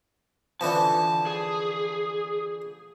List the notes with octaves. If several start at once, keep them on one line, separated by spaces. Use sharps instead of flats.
D3 E3 F3 A5
G#4